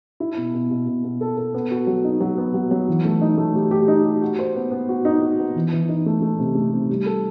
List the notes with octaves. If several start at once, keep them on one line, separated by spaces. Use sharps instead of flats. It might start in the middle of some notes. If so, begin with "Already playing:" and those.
E4
B2
B2
B2
B2
B2
A4
A4
B3
F#4
F#3
D#4
F#3
B3
F#3
F#3
E3
A3
D#4
A3
G4
G4
D#4
G4
F#4
C5
B3
B3
F#4
D#4
F#4
B3
E3
E3
D#4
A3
A3
C3
A3
C3
G3
A4